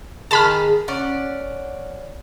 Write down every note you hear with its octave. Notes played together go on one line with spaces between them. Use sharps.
D#3 G#4 A5 B5 F6
C#4 D5 F#5